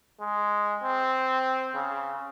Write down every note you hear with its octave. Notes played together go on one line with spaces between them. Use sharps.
G#3
C4
C#3